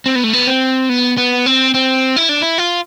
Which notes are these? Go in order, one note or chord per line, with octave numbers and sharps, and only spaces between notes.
C4
B3
A3
B3
C4
B3
B3
C4
C4
E4
D4
E4
F4